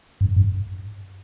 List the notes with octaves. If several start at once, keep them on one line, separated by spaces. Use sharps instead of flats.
G2
G2